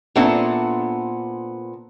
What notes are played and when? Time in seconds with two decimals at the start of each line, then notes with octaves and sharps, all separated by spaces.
0.16 A#2 B3 C4 D4 A4 E5